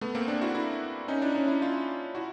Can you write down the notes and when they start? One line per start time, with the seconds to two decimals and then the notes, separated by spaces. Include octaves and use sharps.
0.01 A3 B3
0.15 A#3 C4
0.28 C4 D4
0.42 E4 F#4
0.55 D4 E4
1.08 C#4 D#4
1.21 D4 E4
1.35 C#4 D#4
1.48 D4 E4
1.61 D#4 F4
2.15 E4 F#4